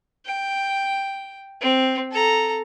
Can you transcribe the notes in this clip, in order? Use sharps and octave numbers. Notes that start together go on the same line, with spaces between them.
G5
C4
A4 A#5